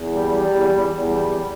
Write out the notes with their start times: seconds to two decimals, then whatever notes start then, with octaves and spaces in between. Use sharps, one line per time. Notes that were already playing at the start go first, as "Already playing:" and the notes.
Already playing: E2
0.12 G3
0.31 G3
0.50 E2
0.69 E2
0.89 E2
1.08 G3
1.27 G3